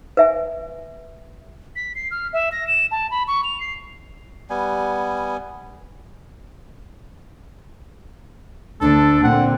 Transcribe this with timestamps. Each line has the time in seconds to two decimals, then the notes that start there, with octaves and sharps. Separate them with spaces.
0.17 B4 E5 G#5
1.76 B6
1.95 C7
2.11 F6
2.33 E5
2.52 A#6
2.67 E7
2.91 A5
3.11 B5
3.28 C#6
3.44 F7
3.60 C7
4.50 G3 B3 G#5
8.81 D2 D4 A4
9.23 A#2 D3 C4 F#5